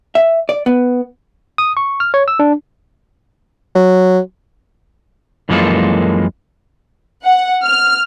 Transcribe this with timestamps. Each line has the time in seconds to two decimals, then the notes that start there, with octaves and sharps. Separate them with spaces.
0.15 E5
0.49 D5
0.66 B3
1.58 D#6
1.77 C#6
2.00 F6
2.14 C#5
2.28 E6
2.39 D4
3.76 F#3
5.49 F#2 E3 F3 G#3 A#3 A4
7.24 F#5
7.64 F6